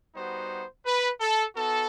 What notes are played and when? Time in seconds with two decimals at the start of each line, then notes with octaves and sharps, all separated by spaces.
0.15 G3 B3 D#4 F#4 C5
0.86 B4
1.21 A4
1.56 B3 D#4 F#4 A4